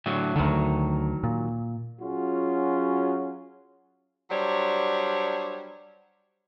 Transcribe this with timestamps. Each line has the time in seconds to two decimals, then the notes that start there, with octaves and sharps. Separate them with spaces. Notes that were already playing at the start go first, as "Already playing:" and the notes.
0.06 A2 D3 F#3
0.36 D2 D3 D#3 F#3
1.24 A#2
1.99 F#3 C#4 F4 F#4 G#4
4.30 F#3 G3 D4 C5 C#5